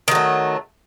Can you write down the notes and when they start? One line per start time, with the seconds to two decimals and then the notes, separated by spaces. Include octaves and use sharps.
0.08 D#3
0.11 F#3
0.15 A3